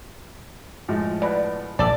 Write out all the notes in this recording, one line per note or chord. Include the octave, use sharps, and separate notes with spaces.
A2 F3 G#3
B2 D5 B5 F#6
A#1 G#2 A4 D5